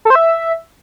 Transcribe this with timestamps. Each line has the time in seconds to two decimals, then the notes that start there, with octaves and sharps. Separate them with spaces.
0.05 A4
0.10 C5
0.15 E5